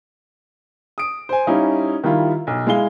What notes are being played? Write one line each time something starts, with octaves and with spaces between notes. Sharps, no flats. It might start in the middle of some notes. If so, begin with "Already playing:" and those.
D#6 D7
C5 G#5
G3 C#4 D#4 E4 F5
D#3 G3 E4 F4
B1
G#3 E4 F5 G7